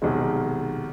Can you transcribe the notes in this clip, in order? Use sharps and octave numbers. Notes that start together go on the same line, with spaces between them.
B1 C3 D#3 G#3